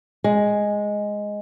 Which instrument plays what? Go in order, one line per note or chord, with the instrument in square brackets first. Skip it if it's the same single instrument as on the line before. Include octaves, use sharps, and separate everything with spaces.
[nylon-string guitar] G#3